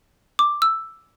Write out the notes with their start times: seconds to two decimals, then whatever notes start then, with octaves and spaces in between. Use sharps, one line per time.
0.39 D6
0.62 E6